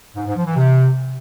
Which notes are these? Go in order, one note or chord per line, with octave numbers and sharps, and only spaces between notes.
G#2
G#2
F3
E3
C3